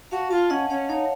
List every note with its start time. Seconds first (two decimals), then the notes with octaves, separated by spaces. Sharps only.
0.11 F#4 F5 A5
0.31 F4 F5 A5
0.50 C#4 D#5 F#5
0.70 C#4 C#5 F5
0.89 D#4 C#5 F5